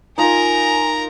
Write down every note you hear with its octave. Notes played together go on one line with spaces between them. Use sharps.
D#4 F4 A#4 G#5 A#5